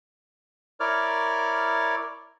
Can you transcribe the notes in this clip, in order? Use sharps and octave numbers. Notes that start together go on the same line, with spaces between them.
E4 A#4 C#5 D5 D6 F6